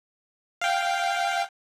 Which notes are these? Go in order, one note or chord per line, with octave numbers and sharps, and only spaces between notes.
F5 G5